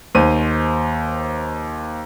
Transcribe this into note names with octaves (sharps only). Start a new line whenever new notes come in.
D#2 C5 D#7